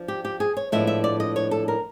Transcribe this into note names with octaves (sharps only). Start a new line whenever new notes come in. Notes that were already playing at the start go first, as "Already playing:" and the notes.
Already playing: F3 D4
G4
G4
G#4
C#5
A2 F3 G#3 B3 D4 E5
E5
D5
D#5
C#5
A4
A#4